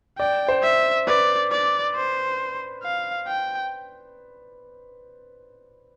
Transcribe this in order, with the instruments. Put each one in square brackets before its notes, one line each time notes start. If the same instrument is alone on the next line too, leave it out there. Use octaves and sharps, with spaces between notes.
[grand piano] D5 [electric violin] G5
[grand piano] C5
[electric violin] E5
[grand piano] B4 [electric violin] D5
[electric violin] D5
C5
F5
G5